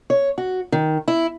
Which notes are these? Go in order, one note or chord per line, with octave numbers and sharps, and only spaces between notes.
C#5
F#4
D#3
E4